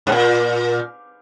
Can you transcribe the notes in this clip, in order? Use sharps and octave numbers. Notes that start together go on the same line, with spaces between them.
G#2
A#2